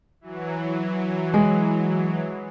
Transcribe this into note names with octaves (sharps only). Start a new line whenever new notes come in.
E3 F#3
G#3